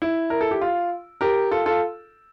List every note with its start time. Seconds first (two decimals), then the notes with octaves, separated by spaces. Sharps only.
0.02 E4
0.30 A#4
0.41 A4
0.51 G4
0.61 F4
1.21 G4 A#4
1.51 F4 A4
1.66 F4 A4